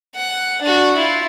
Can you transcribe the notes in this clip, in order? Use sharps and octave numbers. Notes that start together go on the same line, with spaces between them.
F#5
D4 F#4
E4 F4